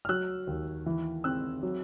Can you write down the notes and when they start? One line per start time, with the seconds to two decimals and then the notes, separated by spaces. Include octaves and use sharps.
0.05 F6
0.09 F#3 E6 F#6
0.47 D#2
0.86 E3
1.24 C4 E6 F#6
1.63 F#3